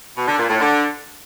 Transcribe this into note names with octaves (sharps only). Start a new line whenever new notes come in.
B2
D3
A#2
A2
D3